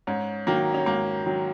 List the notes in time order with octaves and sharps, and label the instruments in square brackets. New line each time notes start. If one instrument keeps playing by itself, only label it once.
[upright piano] G#2 C#4
D#3 F#3 A#3
C#4
G#2 A#3
D#3 F#3